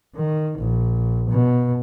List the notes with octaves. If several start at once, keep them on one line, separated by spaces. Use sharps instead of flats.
D#3
A#1
B2